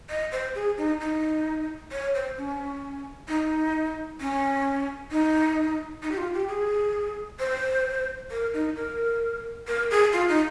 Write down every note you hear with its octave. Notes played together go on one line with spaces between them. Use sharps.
D#5
C5
G#4
D#4
D#4
C#5
C5
C#4
D#4
C#4
D#4
D#4
G4
F4
G4
G#4
C5
A#4
D#4
A#4
A#4
G#4
F4
D#4